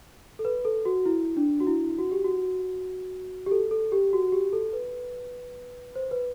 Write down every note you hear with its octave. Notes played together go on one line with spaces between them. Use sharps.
A4
B4
A4
F#4
E4
D4
F#4
E4
F#4
G4
F#4
G4
A4
A4
G4
F#4
G4
A4
B4
C5
B4